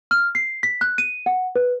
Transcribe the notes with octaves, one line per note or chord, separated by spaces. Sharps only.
F6
C7
B6
F#6
D#7
F#5
B4